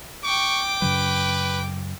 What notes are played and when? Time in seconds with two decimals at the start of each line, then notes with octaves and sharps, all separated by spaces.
0.24 G5 C#6 D6
0.82 F#2 C#3 F#3 B4